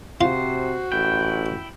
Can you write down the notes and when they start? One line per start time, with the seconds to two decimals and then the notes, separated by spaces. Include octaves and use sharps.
0.21 C3 F4 F#4 C5
0.92 A1 E4 G5